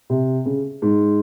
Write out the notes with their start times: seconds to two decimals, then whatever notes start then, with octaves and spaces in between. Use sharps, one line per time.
0.10 C3
0.45 C#3
0.82 G#2